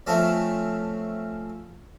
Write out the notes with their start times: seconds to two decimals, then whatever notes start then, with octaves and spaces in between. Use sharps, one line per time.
0.07 F3 A3 C4 C#4 A4 E5